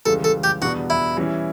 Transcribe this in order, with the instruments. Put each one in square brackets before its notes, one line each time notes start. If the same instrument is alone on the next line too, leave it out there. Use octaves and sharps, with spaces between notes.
[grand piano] C#2 C#3 E3 G3 [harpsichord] A4
[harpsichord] A4
G4
[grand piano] E2 B2 G3 B3 D4 [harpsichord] F#4
[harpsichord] E4
[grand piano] E3 G3 C#4 E4